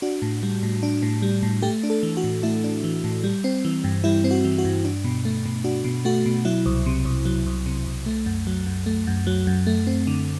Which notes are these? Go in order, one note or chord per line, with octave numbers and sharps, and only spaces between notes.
D4 F#4
A2
G3
A2
D4
A2
G3
A2
A3 G4
D4
A4
E3
F#4
A2
A3 E4
D4
E3
A2
G3
C4
E3
G2
G3 E4
C4
F#4
E3
F#4
G2
D4
B2
A3
B2
D4 F#4
B2
A3 F#4
B2
F#3 E4
C2
C3
C2
F#3
C2
C3
C2
A3
F#2
F#3
F#2
A3
F#2
F#3
F#2
A3
C4
D3